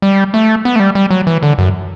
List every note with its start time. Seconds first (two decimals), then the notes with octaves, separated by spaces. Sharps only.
0.02 G3
0.34 A3
0.65 B3
0.76 A3
0.80 G3
0.95 G3
1.11 F#3
1.27 E3
1.43 D3
1.58 F#2